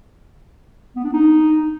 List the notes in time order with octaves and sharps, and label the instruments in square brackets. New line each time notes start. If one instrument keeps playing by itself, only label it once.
[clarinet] B3
D4
D#4